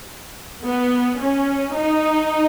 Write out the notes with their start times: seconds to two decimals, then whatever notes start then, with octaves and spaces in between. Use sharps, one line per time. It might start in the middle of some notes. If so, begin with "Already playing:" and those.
0.64 B3
1.19 C#4
1.75 D#4